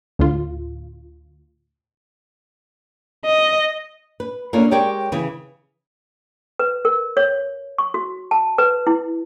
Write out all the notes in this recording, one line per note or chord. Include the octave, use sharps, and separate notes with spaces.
D2 A2 F4
D#5
B4
A#3 C#4 D4 F4 A4
G#3 G4 A#4 C#5 D5 G5
C#3 E3
B4
A#4
C#5
C#6
F#4
A5
B4
E4